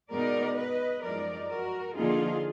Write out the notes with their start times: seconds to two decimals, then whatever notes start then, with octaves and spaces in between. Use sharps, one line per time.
0.11 B2 G#3 B3 D#4 A#4 D5
0.56 B4 D#5
1.03 F#2 F3 G#3 D#4 A#4 D5
1.49 F#4 A#4
1.95 D3 F3 A#3 D#4 F4 G#4